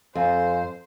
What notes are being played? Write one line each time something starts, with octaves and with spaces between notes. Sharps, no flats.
F2 A4 C5 F5 G#5